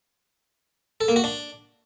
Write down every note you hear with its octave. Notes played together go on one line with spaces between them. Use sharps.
A4
A#3
F#4
D4